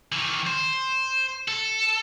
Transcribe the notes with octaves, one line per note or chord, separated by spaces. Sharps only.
D#3 E3
C5
A4